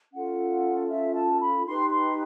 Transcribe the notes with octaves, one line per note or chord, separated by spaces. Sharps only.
C#4 F4 A4 F#5
E5
A5
B5
D#4 G4 B4 C6
C6